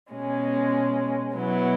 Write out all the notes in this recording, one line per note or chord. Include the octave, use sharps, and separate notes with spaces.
B2 G#3 C#4
B2 F#3 B3 E4